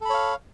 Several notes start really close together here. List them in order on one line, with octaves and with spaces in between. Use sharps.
A4 B5 C#5 F5